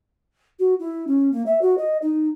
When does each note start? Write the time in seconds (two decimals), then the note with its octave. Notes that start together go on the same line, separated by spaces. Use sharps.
0.59 F#4
0.80 E4
1.07 C#4
1.32 A#3
1.46 E5
1.62 F#4
1.78 D#5
2.02 D#4